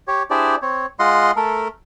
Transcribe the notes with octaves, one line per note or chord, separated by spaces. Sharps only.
G4 C#5
D4 E4 G4 G#4 C5 D5
C4 C#5
G#3 F4 D#5 F#5 C6
A3 A4 A#4